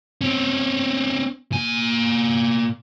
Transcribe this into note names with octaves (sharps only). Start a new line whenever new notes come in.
C4 C#4
A#2 G#5